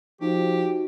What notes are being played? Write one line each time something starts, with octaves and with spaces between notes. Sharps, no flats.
F3 D#4 F#4 G4